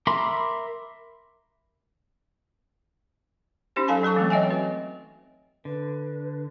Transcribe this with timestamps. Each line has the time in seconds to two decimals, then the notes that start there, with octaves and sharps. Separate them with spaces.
0.07 A#4 E5 B5 C6 D6
3.76 C#4 D#4 G4 C5
3.88 F#3 A4 F5 G#5 A5
4.03 F#3 A4 A5 C#6
4.16 E3 G#3 A3 C4
4.30 C#5 D#5 E5 G5 G#5
4.50 F#4 B4
5.65 D3 B4